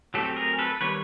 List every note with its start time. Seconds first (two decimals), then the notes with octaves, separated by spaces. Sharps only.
0.14 F#3 A3 C4 G4 A4
0.36 G#4 A#4
0.59 A4 B4
0.81 D#3 G3 B3 B4 C#5